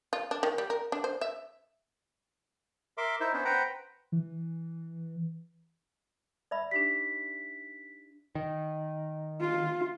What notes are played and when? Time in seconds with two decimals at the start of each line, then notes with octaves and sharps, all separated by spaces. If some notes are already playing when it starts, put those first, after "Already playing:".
0.13 F4
0.31 D4
0.43 D#3
0.58 G3
0.70 A#4
0.92 D4
1.04 C5
1.21 E5
2.98 A#4 E5 C6 D6
3.20 D#4 E4 C5 E5
3.33 B3 C#4 D4 C5
3.45 B4 C5 F#5 G5 A#5
4.12 E3
6.51 D5 E5 B5
6.71 D4 D#4 G4 B6
8.35 D#3
9.40 F4